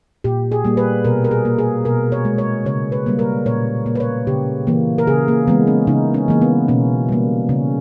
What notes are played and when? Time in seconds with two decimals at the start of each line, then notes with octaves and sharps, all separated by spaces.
0.24 A#2 G4
0.52 G#4
0.65 G3 A#3
0.77 B4
1.05 B2 A#4
1.24 A#4
1.31 G#4
1.45 A#3
1.58 G#4
1.85 B2 A#4
2.12 C#5
2.25 G#3
2.38 C#5
2.66 C#3 C#5
2.92 B4
3.06 G3 A#3
3.19 A#4
3.46 A#2 C#5
3.86 A#3
3.95 B4
4.00 C#5
4.27 C#3 G4
4.67 E3 A#3
4.98 A#4
5.07 C#3 G#4
5.28 A#3
5.47 E3 G#3 B3
5.67 C#4
5.87 C#3 D#4
6.14 C#4
6.28 E3 A#3
6.42 B3
6.68 B2 C#4
7.08 G3 A#3
7.49 C#3 C#4